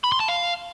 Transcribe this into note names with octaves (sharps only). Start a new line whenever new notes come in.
B5
C6
A5
F5